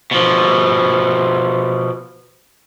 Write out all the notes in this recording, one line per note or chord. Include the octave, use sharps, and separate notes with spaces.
B2 F3